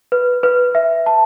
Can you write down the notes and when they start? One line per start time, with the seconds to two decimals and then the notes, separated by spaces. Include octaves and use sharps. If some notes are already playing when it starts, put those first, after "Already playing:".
0.12 B4
0.43 B4
0.75 E5
1.06 A5